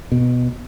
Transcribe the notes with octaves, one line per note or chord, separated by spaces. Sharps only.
B2